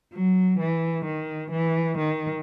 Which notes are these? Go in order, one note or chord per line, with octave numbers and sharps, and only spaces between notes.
F#3
E3
D#3
E3
D#3